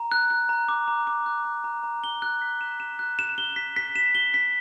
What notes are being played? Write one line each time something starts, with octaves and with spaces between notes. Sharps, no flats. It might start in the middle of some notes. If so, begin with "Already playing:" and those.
Already playing: A#5
F#6
F#6
A#5
D6
A#5
D6
F#6
A#5
A#5
A#5
G7
F#6
B6
E7
E7
F#6
E7
G7
B6
B6
E7
G7
B6